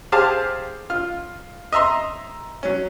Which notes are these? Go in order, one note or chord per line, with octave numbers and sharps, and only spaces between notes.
G4 G#4 C5 F5 A5
F4 F6
D#5 E5 A#5 C6
F#3 C#4